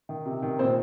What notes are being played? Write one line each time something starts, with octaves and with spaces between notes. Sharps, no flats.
D#3
C3
D#3
A#2 C4 C5